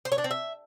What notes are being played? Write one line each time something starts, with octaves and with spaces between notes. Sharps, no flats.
C5
C#5
D4
C4
E5